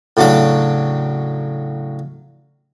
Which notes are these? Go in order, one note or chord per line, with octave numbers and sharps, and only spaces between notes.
A2 C#3 F#3 D4 D6